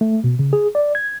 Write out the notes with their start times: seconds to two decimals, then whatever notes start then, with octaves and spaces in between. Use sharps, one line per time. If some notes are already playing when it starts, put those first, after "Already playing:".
0.01 A3
0.24 B2
0.39 C#3
0.53 G#4
0.75 D5
0.95 G#6